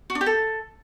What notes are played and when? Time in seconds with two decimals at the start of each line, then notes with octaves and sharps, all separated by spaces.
0.10 F#4
0.15 D4
0.21 G4
0.26 A4